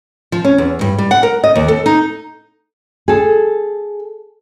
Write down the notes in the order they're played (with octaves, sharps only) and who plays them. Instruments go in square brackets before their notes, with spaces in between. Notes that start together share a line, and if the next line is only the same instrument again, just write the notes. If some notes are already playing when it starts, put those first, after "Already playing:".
[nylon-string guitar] F3
C#4
E2
G2
G3
F#5
A#4
D#5
D#2
A4
D#4
G#4 A4